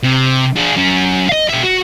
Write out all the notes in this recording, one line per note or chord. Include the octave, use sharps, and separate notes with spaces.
C3
D4 G#4
F#3 C#4
D#5 F5
B2 E5
F#4